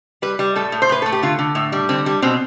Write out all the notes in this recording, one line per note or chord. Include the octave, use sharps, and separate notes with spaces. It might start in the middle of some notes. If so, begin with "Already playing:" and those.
G3 B4
G3
A2 A4
A2
C5
A2 B4
A3 A4
G4
D3 F4
D3
A2
G3
D3 C4
G3
B2 C4